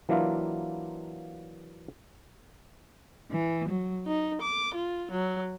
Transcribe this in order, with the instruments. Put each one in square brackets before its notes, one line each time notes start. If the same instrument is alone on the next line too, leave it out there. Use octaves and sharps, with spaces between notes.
[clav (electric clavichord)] E3 F#3 A#3 D4 E4 F4
[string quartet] E3
F#3
D#4
D6
F4
F#3